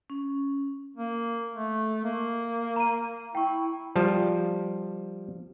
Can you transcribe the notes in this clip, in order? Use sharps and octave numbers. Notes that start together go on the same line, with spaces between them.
C#4
A#3
A3
A#3
A#5 D#7
E4 G5 C#6
F3 G3 A5